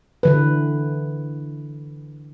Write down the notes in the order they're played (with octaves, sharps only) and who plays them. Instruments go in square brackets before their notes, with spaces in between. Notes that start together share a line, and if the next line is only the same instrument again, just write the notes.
[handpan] D3 E3 B4